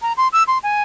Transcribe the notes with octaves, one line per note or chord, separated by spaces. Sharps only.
A#5
C6
E6
C6
G#5